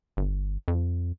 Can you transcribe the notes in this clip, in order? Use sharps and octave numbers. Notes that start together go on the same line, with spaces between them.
G1
F2